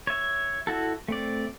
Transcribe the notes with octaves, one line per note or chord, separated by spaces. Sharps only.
C#5 E5
E4 F#4 A4
A3 C4 D5